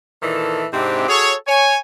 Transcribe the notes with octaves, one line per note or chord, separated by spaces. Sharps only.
A#2 D#3 E3 E4 A4
G#2 C3 C4 D4 E4 G4
F#4 G#4 A4 C#5
C#5 G#5